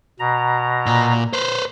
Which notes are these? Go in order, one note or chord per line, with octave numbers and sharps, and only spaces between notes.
B2 A#5
A#2
B4 C5